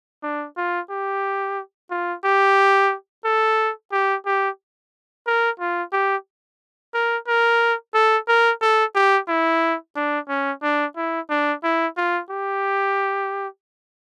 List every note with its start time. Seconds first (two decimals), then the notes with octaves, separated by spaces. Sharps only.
0.23 D4
0.57 F4
0.90 G4
1.91 F4
2.24 G4
3.25 A4
3.92 G4
4.26 G4
5.27 A#4
5.60 F4
5.93 G4
6.94 A#4
7.27 A#4
7.94 A4
8.28 A#4
8.61 A4
8.95 G4
9.28 E4
9.96 D4
10.29 C#4
10.62 D4
10.97 E4
11.30 D4
11.64 E4
11.97 F4
12.30 G4